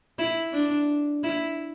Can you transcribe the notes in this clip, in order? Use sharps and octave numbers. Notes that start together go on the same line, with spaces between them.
E4
D4
E4